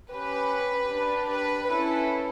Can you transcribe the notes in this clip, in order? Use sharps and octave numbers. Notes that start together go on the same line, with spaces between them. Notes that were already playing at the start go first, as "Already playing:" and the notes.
C#4 G4 B4
D4 G4
B4
C#4 E4 A4 B4